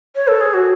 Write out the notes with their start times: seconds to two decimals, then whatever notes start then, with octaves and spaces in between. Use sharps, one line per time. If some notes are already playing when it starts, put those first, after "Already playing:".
0.15 C#5
0.28 A4
0.41 G#4
0.54 F#4